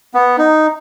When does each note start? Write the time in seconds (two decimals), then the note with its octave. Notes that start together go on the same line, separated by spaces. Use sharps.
0.14 B3
0.38 D#4